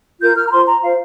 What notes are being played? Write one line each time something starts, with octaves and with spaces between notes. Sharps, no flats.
F4 A#4 G6
F6
A#5
F4 C5 C6
A#5
F4 C5 F5